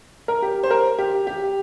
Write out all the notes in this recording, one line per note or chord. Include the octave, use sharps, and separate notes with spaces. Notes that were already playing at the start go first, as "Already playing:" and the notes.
A#4
G4
C5
A#4
G4
G4